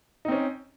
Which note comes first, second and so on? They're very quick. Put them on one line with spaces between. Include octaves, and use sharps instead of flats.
D#4 C4 C#4